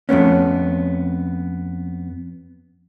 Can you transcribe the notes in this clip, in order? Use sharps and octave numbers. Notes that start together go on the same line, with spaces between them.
F2 A3 B3 C#4